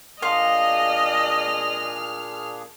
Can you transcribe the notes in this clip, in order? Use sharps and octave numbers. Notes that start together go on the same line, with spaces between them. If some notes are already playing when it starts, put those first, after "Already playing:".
A#2 D4 G#4 D#5 F5 C6 F6